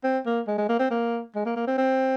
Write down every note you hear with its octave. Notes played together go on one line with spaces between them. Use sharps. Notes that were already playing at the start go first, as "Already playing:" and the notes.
C4
A#3
G#3
G#3
A#3
C4
A#3
G#3
A#3
A#3
C4
C4